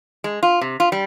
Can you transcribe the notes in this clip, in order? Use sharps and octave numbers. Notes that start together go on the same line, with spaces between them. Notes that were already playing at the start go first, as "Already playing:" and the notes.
G#3
F4
C3
F4
G3